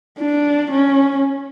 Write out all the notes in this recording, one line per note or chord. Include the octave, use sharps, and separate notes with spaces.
D4
C#4